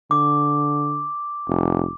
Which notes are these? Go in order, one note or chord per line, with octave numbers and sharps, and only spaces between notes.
D3 D6
F1